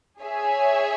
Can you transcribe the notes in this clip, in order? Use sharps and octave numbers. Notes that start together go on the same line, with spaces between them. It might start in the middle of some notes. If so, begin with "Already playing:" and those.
G#4 C#5 E5 G#5